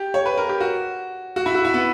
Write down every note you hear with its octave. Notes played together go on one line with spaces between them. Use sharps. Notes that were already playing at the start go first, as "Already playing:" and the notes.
Already playing: G4
C#5
B4
A#4
G4
F#4
F#4
E4
F#4
E4
B3